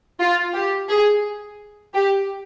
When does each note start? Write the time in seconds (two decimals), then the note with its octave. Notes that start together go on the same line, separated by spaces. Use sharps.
0.20 F4
0.54 G4
0.89 G#4
1.94 G4